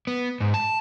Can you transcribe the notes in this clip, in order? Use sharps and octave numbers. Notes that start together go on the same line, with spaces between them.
B3
G#2
A5